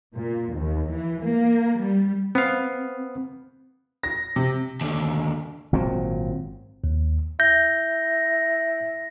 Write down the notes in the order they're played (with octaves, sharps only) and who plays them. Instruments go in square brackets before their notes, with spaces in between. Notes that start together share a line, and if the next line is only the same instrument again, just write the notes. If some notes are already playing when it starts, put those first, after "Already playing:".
[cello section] A#2
D#2
E3
A#3
G3
[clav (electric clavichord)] B3 F5 [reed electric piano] C4
[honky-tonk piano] A#6
C3
[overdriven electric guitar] D#2 D3
[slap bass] G#1 A#2 F#3 C4
[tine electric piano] D#2
[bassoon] E4 [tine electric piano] G6 [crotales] A#6